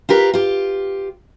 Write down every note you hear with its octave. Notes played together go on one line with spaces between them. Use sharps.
F4 G4 A#4 B4
F4 G4